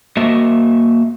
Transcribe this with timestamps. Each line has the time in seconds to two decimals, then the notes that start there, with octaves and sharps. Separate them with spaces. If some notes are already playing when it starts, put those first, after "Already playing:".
0.17 A#3 F#4 D#5 E5